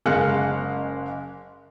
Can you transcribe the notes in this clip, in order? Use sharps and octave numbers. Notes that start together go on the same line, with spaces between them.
F#1 G#3 A#4 F5 F#6 C#7